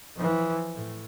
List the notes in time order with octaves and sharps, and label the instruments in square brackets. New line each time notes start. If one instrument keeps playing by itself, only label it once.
[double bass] E3 F3
A2